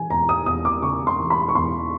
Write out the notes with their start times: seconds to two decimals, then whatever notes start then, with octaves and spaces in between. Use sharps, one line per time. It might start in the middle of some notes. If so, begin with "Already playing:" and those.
Already playing: E3 G#5
0.10 E2 A#5
0.29 D#6
0.46 E2 D#6
0.65 D6
0.82 C#3 C#6
1.07 C6
1.19 E3
1.30 B5
1.49 C#6
1.55 E2 C6